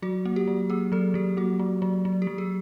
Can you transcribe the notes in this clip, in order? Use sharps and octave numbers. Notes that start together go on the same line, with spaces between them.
F#3 F#4
A#3
G4
F#3
A#3 G#4
F#3 A4
F#3 G4
A#3 F#4
F#3
F#3
F#3
G4
F#3
G#4